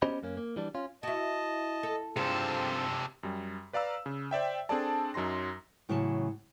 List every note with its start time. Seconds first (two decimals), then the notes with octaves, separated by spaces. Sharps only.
0.02 B3 C#4 G4 C5 D#5 B5
0.23 F#2 A#3 C#4
0.37 A#3
0.56 E3 G3 D4
0.75 C#4 F4
1.03 E4 F#4 D#5 A5
1.83 A4
2.16 G2 C3 C4 D4 F4 G#4 A4
3.23 F#2 G3
3.73 B4 D5 F5 A#5 E6
4.06 C#3
4.31 C5 D5 E5 G5
4.69 C4 D4 G#4 A4 D5 A5
5.14 F#2 F#3 D#4 C6 A#6
5.89 A2 C#3 E3 F#3 E5 A5